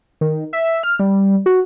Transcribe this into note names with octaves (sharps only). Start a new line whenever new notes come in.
D#3
E5
F6
G3
F#4